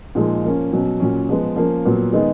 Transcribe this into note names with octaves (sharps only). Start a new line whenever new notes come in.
A#2 F3 G#3 D#4
F3 A#3 C#4
B2 F#3 C#4
A#2 F#3 C#4
F3 G#3 B3
F3 A#3 C#4
A#2 F#3 B3
D#3 G#3 B3 D#4